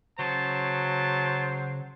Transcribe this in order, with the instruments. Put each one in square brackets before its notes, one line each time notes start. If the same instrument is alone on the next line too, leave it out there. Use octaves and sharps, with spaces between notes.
[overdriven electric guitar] C#3 [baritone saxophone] F#3 [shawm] C5 [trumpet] A5